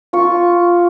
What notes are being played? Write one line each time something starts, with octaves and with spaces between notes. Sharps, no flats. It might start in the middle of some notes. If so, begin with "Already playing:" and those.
F4 C#6